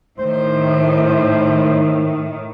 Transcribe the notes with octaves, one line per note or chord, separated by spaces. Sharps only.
A2 D#3 C5